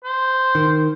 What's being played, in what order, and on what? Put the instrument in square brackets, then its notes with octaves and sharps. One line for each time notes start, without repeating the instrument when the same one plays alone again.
[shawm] C5
[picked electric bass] D#3